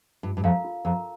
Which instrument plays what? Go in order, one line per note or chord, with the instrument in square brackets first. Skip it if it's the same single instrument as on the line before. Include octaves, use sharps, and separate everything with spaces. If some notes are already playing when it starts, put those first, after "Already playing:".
[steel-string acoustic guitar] G2 [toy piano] F4
[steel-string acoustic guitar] G2
[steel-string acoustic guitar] F2 [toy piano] A#4 F5 A#5
[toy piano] F4
[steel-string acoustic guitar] F2 [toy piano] A#4 F5 A#5